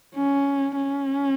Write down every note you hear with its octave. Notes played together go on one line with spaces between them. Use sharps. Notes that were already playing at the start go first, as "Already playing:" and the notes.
C#4
C#4